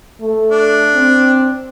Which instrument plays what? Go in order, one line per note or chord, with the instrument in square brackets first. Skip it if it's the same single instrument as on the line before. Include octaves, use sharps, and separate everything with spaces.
[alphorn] A3
[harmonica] D4
[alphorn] C4